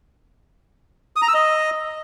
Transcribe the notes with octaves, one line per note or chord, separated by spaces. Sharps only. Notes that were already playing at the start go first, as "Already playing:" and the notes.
D#6
A#5
E6
D#5